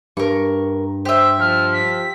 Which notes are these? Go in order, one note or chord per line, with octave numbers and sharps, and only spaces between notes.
G2 A#4 C#6
G4 C5 E5
F3 F6
B6